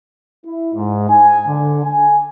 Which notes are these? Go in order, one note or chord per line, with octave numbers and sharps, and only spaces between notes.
E4
G#2
G#5
D3
G#5